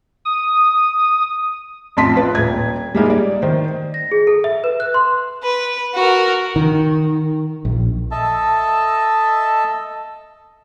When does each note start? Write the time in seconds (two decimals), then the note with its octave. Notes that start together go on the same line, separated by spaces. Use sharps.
0.25 D#6
1.97 A1 F2 A5 C6 B6
2.15 F4 B4
2.35 D#1 G#6
2.95 G3 G#3 A#3 D#4
3.10 D5
3.42 D#3 C5
3.94 A#6
4.12 G#4
4.27 A4
4.44 E5
4.64 B4
4.80 F#6
4.94 C6
5.43 B4
5.94 F#4 A#4
6.56 D#3
7.65 A#1
8.11 A4 D#5 E5 A5